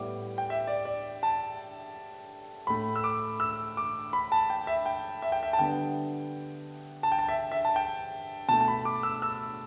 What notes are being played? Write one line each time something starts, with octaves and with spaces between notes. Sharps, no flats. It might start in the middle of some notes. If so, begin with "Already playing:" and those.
Already playing: A2 G3 B3 D6
G5
E5
D5
D5
A5
A2 A3 B5
E6
D6
E6
D6
B5
A5
G5
E5
G5
E5
G5
E5
A5
D3 G3 B3 G5
A5
G5
A5
E5
E5
A5
G5
B2 A3 A5
A5
B5
D6
E6
E6